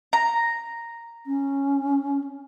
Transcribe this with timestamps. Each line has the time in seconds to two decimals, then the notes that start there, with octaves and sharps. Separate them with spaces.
0.13 A#5
1.27 C#4